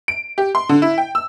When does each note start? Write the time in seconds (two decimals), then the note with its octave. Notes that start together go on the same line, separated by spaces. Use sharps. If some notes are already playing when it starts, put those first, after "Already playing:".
0.08 D7
0.38 G4
0.55 C6
0.69 D3
0.82 E4
0.98 G5
1.15 E6